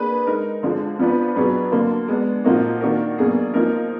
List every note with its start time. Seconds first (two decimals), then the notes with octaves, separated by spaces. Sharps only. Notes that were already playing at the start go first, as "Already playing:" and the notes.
Already playing: A#3 D4 G#4 B4
0.26 G#3 D#4 A#4
0.63 D3 F3 G#3
0.99 F3 B3 D4 F4 B4
1.35 B2 F#3 D4 G#4 B4
1.72 D3 F#3 A#3
2.08 G#3 B3 D4
2.44 A#2 F3 A#3 D#4 F#4
2.81 D#3 A#3 D4 F#4 A#4
3.18 B2 F#3 A#3 D4 G#4
3.54 F3 A#3 D#4 A#4